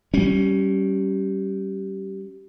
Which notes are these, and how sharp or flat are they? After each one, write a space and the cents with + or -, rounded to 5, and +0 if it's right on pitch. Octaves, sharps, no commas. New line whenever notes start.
G3 -20 C#4 +0